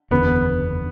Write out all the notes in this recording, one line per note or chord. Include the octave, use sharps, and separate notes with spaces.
F#1 E2 D3 B3